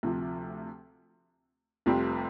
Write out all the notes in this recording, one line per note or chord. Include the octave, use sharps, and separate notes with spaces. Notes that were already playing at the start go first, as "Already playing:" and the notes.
D2 C3 F3
F1 F2 C3 G3 C4